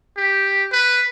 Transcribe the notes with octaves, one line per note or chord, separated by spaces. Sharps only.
G4
B4